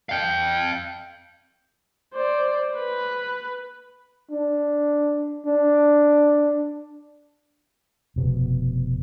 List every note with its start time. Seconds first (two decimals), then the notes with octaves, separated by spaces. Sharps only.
0.09 F5 G5
2.14 C5 D5
2.76 B4
4.31 D4
5.46 D4
8.16 F1 B2